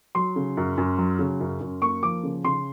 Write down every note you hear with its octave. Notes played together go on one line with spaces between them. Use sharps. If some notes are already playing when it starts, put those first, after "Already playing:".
F#3 C6
C#3
F#2
F#2
F#3
C#3
F#2
F#2
A#3 C#6
F3 D6
C#3
C#3 C6